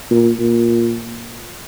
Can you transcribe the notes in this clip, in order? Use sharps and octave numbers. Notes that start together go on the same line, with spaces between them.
A#2
A#2